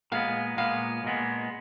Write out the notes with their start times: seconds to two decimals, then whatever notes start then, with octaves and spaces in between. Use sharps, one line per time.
0.12 A#2 G#3 B3 F5
0.57 A#2 G#3 B3 F5
1.04 A#2 G#3 B3